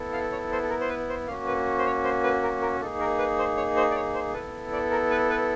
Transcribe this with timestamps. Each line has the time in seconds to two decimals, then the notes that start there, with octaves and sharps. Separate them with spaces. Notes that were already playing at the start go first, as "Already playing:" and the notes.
Already playing: B3 E4 A4
0.13 F5
0.32 C#5
0.52 C5
0.63 A4
0.70 A#4
0.81 C5
0.89 B4
1.09 C5
1.27 A#3 F5
1.30 C#4 F#4
1.47 B4
1.79 C5
1.86 C#5
2.04 C5
2.24 B4
2.43 A#4
2.62 A#4
2.80 A#3 D#4 G#4 A4
3.00 A#4
3.18 B4
3.39 C5
3.57 C#5
3.77 C5
3.91 D5
3.95 C#5
4.14 C5
4.34 B3 E4 A4 B4
4.73 D5
4.91 A#4
5.11 B4
5.30 B4